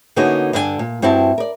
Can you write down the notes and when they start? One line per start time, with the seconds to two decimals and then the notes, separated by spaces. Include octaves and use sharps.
0.16 D3 A#3 B3 C#4 D#4 F#4
0.53 G2 D3 D4 A4 A#4 G#5
0.79 A#2
1.02 G2 C4 E4 F#4 A5
1.38 A#4 D5